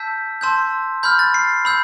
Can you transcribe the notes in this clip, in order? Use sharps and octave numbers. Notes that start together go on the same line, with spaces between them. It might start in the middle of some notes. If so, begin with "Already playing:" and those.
Already playing: A5 E6 G6 B6
A5 C6 E6 G6
B5 F6 G6
A6
C7
B5 E6 G6